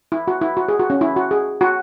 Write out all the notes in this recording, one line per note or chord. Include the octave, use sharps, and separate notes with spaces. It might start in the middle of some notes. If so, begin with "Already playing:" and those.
E4
F#4
E4
F#4
G#4
F#4
C#4
E4
F#4
G#4
F#4